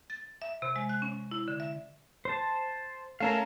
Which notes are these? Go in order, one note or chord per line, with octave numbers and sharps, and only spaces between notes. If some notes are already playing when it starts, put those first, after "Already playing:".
A6
E5
C3
G#3
F#6
C#4
E4
D3
E5
C5 A5
A3 C#4 A#4 F5 A5 A#5